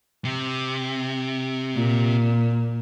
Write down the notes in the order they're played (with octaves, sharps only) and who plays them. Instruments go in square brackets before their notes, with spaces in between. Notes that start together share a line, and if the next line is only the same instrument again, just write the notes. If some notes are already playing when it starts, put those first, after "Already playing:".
[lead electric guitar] C3
[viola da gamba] A#2